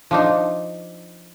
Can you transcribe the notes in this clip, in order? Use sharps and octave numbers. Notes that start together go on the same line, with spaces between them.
F3 D4 D#4